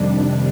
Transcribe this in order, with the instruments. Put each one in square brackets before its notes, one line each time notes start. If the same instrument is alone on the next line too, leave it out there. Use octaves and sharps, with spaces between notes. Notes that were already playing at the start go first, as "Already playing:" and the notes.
Already playing: [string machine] F2 C3 D#3 G3 D4